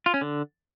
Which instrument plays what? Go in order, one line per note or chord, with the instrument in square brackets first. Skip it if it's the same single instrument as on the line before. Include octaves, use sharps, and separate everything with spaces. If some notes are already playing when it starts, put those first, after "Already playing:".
[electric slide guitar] F4
C#4
D3